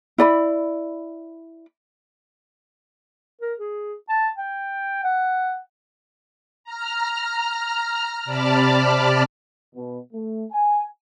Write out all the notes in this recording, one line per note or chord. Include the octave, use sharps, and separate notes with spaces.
E4 D5 B5
A#4
G#4
A5
G5
F#5
A#5 F6
C3 D5 A5 B5 D6 F6
B2
A3
G#5